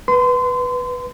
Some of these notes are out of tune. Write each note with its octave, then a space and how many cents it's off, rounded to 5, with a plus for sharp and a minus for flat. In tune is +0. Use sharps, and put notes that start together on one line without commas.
B4 +0 C6 -30